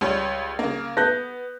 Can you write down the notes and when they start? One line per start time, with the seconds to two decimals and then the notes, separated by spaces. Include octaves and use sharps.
0.01 C#2 G3 C#5
0.59 C#3 A#3
0.97 B3 F#6 G6 A#6